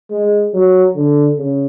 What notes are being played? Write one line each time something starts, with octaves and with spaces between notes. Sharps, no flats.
G#3
F#3
D3
C#3